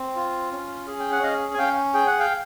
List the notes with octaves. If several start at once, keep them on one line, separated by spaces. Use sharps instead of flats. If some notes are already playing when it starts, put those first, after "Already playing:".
Already playing: C4
F4
C#4
G#4
G5
F#5
C#4 D#5 F5
G#5
C#4 F5 G5
G#4 G5
F#5
F5 G5